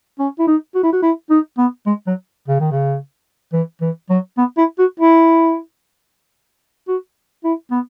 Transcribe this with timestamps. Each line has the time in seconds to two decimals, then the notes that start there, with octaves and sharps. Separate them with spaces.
0.19 C#4
0.39 E4
0.47 D#4
0.75 F#4
0.83 E4
0.93 F#4
1.03 E4
1.30 D#4
1.58 B3
1.86 G#3
2.07 F#3
2.48 C#3
2.60 D#3
2.72 C#3
3.53 E3
3.81 E3
4.10 F#3
4.38 B3
4.57 E4
4.79 F#4
5.00 E4
6.88 F#4
7.44 E4
7.71 B3